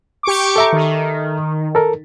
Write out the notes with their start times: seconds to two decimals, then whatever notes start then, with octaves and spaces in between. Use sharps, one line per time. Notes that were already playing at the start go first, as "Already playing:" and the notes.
0.23 G4 C#6 D6
0.56 A4 E5 A#5
0.72 D#3
1.75 A4 A#4